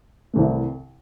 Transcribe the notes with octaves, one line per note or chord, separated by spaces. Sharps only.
C2 C3 E3 A3